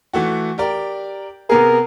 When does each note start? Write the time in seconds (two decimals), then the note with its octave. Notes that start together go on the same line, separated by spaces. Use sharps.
0.13 E3 A3 F#4
0.58 G4 A#4 D5
1.49 C3 B3 G#4 A#4